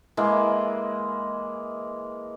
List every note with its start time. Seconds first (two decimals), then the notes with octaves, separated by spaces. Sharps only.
0.17 E3 G#3 A#3